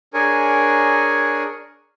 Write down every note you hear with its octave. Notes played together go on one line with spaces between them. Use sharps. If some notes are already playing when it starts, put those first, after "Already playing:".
D4 G#4 A#4 C#5 G#5